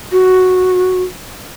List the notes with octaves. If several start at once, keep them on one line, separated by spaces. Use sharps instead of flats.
F#4